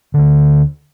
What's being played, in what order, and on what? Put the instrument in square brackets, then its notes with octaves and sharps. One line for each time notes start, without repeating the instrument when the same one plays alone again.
[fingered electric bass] D2 D3